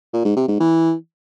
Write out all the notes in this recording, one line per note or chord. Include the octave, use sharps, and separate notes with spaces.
A#2
G#2
C3
G#2
E3